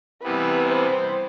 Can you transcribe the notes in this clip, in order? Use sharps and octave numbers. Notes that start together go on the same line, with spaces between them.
C3 E3 G3 B3 B4
C5